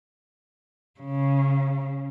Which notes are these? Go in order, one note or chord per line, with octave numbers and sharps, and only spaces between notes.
C#3